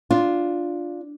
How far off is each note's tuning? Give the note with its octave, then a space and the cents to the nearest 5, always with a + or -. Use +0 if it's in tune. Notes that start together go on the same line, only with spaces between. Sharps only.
D4 +0 F4 +0